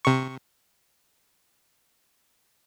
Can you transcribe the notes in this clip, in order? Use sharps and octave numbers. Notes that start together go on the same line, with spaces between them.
C3 C#6